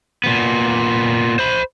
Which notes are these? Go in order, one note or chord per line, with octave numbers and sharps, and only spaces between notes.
A#2 B3
C5 B5